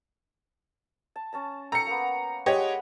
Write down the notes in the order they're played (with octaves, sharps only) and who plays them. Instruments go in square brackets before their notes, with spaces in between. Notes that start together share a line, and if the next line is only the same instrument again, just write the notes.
[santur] A5
C#4 A5 A#5
[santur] A4 G5 [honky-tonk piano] A#5 C#7
[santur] A#3 B3
[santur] G#3 F#5 [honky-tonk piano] G4 C#5 D#5